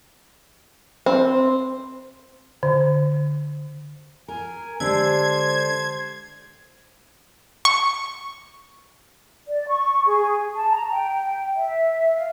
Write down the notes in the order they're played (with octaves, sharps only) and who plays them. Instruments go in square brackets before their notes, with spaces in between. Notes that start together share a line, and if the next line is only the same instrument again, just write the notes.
[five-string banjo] C4
[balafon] D3
[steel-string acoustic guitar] A#4 [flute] G#5
[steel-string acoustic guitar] D3 D4 [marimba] G#3 G4 E6 [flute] C5 [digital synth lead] G#6
[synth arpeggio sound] C#6
[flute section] D5
C#6
G#4
A5
A#5
G5
E5
F5